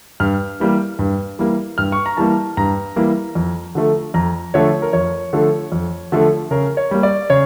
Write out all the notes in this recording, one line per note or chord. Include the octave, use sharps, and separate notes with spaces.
G2 F6
E3 G3 A#3
G2
E3 G3 A#3
G2 F6
C#6
A#5
E3 G3 A#3 A5
G2 A#5
E3 G3 A#3
F2
D3 F3 A3
F2 A#5
D3 F3 A3 C#5
A#4
F2 C#5
D3 F3 A3
F2
D3 F3 A3
C#3 A#4
C#5
G3 A#3
D5
C#3 C#5